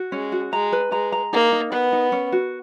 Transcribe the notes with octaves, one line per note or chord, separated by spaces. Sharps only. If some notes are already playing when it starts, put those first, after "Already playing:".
Already playing: F#4
G#3 C#4
F#4
G#3 A#5
B4
G#3 A#5
A#5
A#3 D#4
D#4
B3 B4
D#4
C#4
F#4